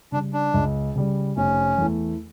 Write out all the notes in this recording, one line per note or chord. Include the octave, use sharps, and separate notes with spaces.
C#3 G3 D4
D4
C#2
C#3 G3
F1 C#4
E2 E3 A3